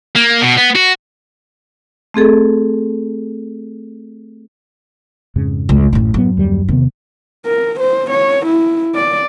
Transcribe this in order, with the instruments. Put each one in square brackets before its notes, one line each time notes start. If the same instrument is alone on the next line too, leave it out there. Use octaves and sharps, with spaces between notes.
[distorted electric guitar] A#3
B2
B3
F#4
[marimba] A3 C4 G#4 A4
[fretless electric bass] F2 G#2 C#3
[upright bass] C#2
[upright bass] A1 A2 [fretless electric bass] F#2
[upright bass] F#2 [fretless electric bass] A2 B3
[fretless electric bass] D#2 D3 G3
[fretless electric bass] E2 D#3 B3 [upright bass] C3
[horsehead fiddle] A#4
C5
C#5
E4
D5